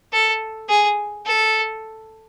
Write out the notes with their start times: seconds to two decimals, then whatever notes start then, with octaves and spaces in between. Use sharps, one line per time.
0.13 A4
0.69 G#4
1.26 A4